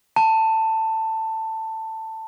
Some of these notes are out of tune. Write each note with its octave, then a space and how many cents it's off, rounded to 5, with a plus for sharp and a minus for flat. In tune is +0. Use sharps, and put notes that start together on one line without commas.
A5 +15